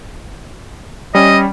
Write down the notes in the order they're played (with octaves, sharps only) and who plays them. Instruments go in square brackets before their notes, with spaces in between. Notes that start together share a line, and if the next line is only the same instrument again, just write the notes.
[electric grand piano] G3 C#4 [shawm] D#5